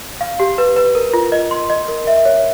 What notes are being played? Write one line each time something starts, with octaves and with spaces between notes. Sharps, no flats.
F5
G4
B4
B4
A#4
F4
D#5
C6
D#5
A#4
E5
C#5